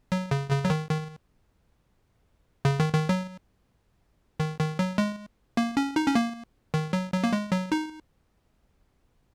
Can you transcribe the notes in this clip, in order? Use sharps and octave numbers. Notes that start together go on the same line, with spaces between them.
F#3
C#3
C#3
F#3
D#3
D#3
C#3
D#3
D#3
F#3
D#3
D#3
F#3
G#3
A#3
C#4
D#4
C#4
A#3
D#3
F#3
F#3
A#3
G#3
F#3
D#4